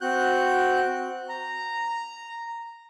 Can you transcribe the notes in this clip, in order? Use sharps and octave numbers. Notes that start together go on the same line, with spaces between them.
C4 F#4 F#6 G6
A#5